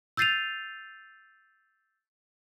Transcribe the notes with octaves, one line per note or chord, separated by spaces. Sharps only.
E6 G6 A6 C7 D#7 F7